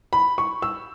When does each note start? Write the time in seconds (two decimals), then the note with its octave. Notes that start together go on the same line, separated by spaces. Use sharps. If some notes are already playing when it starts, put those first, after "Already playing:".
0.13 B5
0.38 C#6
0.62 E6